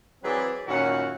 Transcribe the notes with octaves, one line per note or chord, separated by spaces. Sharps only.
E3 F#3 C4 G#4 B4 D5
F#2 A#2 D#3 C#4 E4 F#4